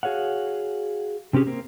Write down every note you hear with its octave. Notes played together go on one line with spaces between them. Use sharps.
F#4 G#4 C#5 F5 F#5
C3 C4 C#4 G4 G#4
A#3 C4